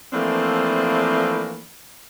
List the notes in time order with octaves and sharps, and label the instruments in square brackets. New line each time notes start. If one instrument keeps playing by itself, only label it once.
[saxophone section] E3 F3 A3 A#3 C4 D4